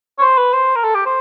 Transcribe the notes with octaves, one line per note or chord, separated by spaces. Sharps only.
C#5
C5
B4
C5
A#4
A4
G4
C5